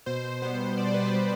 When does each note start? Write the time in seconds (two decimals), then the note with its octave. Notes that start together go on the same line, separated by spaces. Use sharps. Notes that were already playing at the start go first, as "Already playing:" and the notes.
0.06 B2 C5
0.42 G3 B3 C5
0.78 B2 D5
0.86 C5
0.94 B4
1.02 C5
1.14 G3 B3